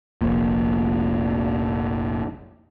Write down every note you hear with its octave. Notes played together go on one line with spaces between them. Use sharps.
F1 A#1 A#2